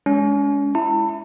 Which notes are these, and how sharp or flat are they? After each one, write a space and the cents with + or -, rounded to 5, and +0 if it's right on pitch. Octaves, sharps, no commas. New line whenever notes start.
G#3 +0 C#4 +35
E4 +0 A5 +40